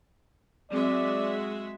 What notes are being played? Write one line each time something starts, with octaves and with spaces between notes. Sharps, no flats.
F#3 G#3 C4 F#4 D5 E5